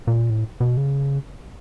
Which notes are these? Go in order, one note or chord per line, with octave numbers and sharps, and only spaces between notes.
A#2
A2
B2
C#3